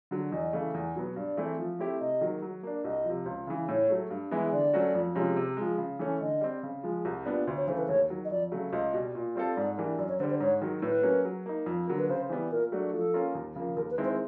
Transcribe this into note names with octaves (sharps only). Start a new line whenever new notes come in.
D3 F#3
E2 D#5
C#3 E3 A3
E2
B2 F#3 B3
G2 D5
E3 A3 C4 E4
F3
A3 C4 E4 G4
C3 D#5
D#3 F#3 A#3
F#3
A#3 D4
C2 D#5
C3 F3
C#2
C#3 E3
A2 C#5
F#3 A3
G2
E3 G#3 B3 E4
D3 D5
F#3 A3 C#4 F#4
F2
C3 F3 G#3 C#4
C3
F3 G#3
C#3
E3 A3 C#4
D3 D#5
G3 C4
C#3
F3 G#3
C2
A#2 G3 B3 D4
D2
C#5
C#3 E3 A3 C5
B4
D#2 C#5
D#3 F#3
D#5
F2 D5
C#3 F#3 A3
C#2 D#5
B2 G3
A#2
G3 C4 F4 A4
G#2 D5
E3 G3 A#3 D4
F#2 D5
C#5
D3 G3 C5
C5
G#2 C#5
D#3 F#3
A2 B4
F#3 A#3 C#4
F#3
A#3 D#4
F2
D3 F#3 A#3
B4
C#3 C5
E3 G3 B3
A#2 A#4
F#3 A3 D4 F#4
F3 A4
A#3 C#4 F4 A#4
D#2
C#3 F3 A#3
D#2 A#4
B4
D#3 G#3 C4 E4
C5